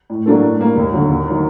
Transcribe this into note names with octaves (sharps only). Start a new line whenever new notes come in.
A2
F#3 A#3 D4 A4
A2
G3 A#3
D#2
D3 F#3
D#2
D#3 F#3